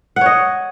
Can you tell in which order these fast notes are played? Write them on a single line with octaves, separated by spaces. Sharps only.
F#5 C#5 D#5